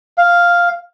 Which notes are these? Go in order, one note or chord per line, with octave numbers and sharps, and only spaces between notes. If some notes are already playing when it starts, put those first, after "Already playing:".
F5